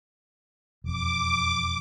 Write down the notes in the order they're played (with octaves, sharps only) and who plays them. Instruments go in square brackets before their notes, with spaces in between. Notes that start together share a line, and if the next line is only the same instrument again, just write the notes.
[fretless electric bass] E1 F2 [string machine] D6